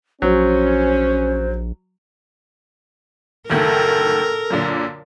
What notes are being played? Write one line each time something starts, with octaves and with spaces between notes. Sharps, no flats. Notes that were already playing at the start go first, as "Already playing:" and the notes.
A#1 F#3 C#4 C5
F#1 D2 D#3 A4 A#4
F#2 A#2 D3